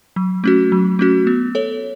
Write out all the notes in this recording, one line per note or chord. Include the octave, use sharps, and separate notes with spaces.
F#3
A3 C#4 F#4
F#3
A3 C#4 F#4
B3
A4 C#5